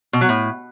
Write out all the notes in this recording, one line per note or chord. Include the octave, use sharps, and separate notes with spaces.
B2
F#3
A2